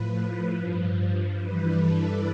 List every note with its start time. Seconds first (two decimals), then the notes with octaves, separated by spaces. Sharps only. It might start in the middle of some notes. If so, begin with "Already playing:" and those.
Already playing: A2 F3 B4
0.53 G2 F3
1.34 G2 E3 G3 B4
1.76 A4